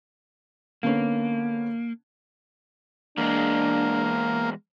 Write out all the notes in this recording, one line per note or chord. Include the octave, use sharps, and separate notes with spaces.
D3 A#3 B3 C#4
E2 G#3 A#3 D4